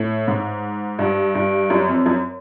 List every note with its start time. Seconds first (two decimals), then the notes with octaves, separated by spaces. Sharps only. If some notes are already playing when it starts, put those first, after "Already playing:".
Already playing: A2
0.28 G#2
0.99 G2
1.35 G2
1.70 F#2
1.88 F2
2.06 F#2